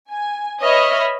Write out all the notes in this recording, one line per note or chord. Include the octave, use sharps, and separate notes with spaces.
G#5
B4 C#5 D#5 E5 B5 F6